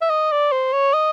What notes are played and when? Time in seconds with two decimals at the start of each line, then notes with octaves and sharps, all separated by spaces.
0.01 E5
0.10 D#5
0.32 D5
0.52 C5
0.73 C#5
0.93 D#5